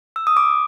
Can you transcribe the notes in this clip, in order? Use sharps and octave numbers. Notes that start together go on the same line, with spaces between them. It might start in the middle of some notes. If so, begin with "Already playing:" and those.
E6
D#6
D6